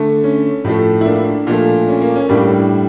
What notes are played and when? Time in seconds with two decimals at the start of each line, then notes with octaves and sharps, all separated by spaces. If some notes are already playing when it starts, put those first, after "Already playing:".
Already playing: D3 A3
0.24 C#4
0.65 A2 F3 A3
1.01 E4
1.05 A#3 D4
1.47 A#2 F3 A3
1.88 C#4
2.02 A#3
2.16 C#4
2.29 A2 G3 A#3 D4